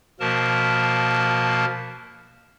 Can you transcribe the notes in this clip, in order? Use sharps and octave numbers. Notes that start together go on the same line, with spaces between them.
B2 F3 A#3 A#4 A5